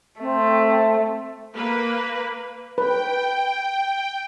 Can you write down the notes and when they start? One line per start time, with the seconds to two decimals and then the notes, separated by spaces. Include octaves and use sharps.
0.21 A3 C4
1.55 A#3 B4
2.78 B4 G5